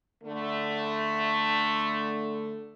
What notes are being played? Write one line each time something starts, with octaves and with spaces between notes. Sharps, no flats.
D3 A3